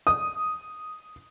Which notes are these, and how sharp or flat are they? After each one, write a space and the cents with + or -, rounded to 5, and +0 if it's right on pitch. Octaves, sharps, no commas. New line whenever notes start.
D#6 +0